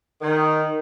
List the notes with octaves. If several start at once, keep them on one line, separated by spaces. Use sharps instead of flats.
D#3